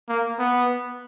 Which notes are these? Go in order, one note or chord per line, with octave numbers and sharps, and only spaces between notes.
A#3
B3